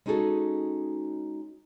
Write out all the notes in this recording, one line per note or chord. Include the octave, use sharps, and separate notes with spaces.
G#3 C#4 D#4 F#4 G#4 A4